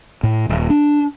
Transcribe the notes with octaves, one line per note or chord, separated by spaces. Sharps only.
A2
D#1
D4